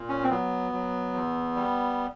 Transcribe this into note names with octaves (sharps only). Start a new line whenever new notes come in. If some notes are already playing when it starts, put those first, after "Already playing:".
Already playing: A#2
C#4
C4
F#3 B3
F#3
E2
G3